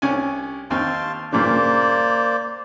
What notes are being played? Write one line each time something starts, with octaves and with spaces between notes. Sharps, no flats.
C2 C#4 G#5
D#2 C4 F5 A5 C6
G2 A#2 C#3 A#3 C5 D5